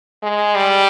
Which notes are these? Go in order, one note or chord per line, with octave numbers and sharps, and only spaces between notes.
G#3
G3